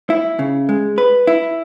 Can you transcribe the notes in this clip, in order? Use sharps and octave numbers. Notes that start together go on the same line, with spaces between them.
E4
C#3
G#3
B4
E4